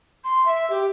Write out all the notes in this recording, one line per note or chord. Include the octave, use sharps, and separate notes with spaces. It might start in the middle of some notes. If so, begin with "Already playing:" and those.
C6
E5
G4